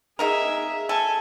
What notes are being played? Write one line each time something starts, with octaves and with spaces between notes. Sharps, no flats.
A#3 D#4 G#4 A#4 E5
A4 G#5